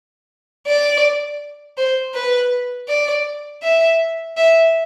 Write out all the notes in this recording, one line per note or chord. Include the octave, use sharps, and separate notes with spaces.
D5
C5
B4
D5
E5
E5